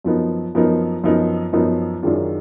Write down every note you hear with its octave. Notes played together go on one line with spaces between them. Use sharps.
F#2 F3 B3 D#4 A#4
F#2 F3 B3 D#4 A#4
F#2 F3 B3 D#4 A#4
F#2 F3 B3 D#4 A#4
F#2 D#3 G#3 D4 F4